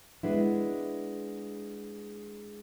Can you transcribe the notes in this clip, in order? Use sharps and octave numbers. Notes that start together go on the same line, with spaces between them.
G#3 B3 D4 E4